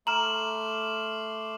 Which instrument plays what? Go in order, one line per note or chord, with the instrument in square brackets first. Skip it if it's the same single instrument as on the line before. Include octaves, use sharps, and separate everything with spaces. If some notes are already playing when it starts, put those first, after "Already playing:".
[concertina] A3 C6 D6 [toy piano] A#5 [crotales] F6 E7 F#7